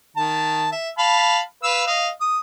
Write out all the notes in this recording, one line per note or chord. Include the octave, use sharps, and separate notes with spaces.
D#3 A5
E5
F5 A5 B5
B4 F5 E6
D#5 F5
D#6